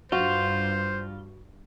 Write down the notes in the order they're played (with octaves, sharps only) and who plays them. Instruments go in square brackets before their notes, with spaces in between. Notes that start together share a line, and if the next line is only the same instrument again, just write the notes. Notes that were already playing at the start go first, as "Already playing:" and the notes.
[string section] G2 [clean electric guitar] F4 [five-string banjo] F#4 [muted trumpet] C5